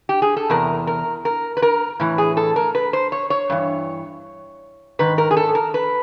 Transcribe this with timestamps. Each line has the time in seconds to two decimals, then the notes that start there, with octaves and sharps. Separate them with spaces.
0.09 G4
0.22 G#4
0.37 A4
0.50 E2 C3 A#4
0.87 A#4
1.25 A#4
1.57 B4
1.62 A#4
2.00 A2 E3
2.18 G#4
2.37 A4
2.56 A#4
2.75 B4
2.93 C5
3.12 C#5
3.30 C#5
3.50 G2 E3
4.99 G#2 D#3 B4
5.18 A#4
5.31 G#4
5.37 A4
5.55 A#4
5.74 B4